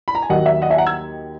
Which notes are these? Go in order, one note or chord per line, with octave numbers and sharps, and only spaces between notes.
B5
A#5
G#5
D#2 D#3 F#3 A#3 D#5 F#5
E5
D#5 F#5
E5 G#5
F#5 A#5
E6 G#6